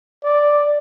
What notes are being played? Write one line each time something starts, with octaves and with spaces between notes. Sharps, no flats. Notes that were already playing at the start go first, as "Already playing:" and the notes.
D5